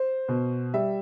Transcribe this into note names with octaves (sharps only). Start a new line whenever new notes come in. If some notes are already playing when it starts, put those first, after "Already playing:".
Already playing: C5
B2
G3 E5